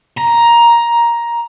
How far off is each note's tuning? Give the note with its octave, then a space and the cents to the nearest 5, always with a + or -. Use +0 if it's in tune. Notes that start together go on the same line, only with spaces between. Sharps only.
A#5 +10